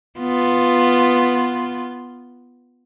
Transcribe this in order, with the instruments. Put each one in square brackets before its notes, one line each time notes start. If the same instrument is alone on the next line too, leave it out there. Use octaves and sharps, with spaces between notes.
[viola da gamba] B3 F4